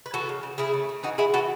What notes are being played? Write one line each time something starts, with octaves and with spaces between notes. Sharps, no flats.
B4
E3 F#4 A4
C#3
C#3
C#3 E4 G#4
A3
A3
E3 D#4 F#4
E3 E4 G#4
E3 F#4 A4